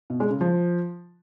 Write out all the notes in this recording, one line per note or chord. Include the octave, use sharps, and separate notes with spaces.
B2
G#3
C#3
F3